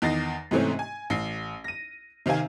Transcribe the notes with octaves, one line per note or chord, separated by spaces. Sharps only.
E2 D#3 D#4 A6 A#6 C7
G#2 C3 E3 A3 C4 C#4
G#5
A1 C7
A#6 D#7
C3 D#3 C4 F5 G#5